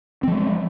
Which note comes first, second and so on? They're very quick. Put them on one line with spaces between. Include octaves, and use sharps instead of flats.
C4 F3 G#3